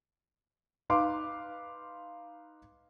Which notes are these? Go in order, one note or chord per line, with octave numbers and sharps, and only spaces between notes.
D#4 B4 F5 C6 D6